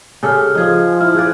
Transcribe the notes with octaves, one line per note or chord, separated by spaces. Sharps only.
C#3 G4 A4 G#5 F6
F3 D#4 G#4
E4 F6
G#4 B4 D5